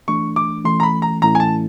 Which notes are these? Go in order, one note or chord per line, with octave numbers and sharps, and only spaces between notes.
E3 A3 D4 C#6
D6
E3 A3 C#4 C6
A#5
B5
A#5
A2 E3 A3 C#4 E4 A#5
G#5
A5